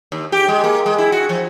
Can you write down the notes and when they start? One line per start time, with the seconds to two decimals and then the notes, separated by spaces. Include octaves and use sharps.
0.12 D#2
0.32 G4
0.48 G#3
0.64 A#3
0.86 G#3
0.98 E4
1.12 F#4
1.29 F3